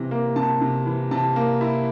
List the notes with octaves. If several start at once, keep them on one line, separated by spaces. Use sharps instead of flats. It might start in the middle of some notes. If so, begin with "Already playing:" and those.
Already playing: C3 E3
A#3
C3 A5
C3
E3
C3 A5
A#3
E4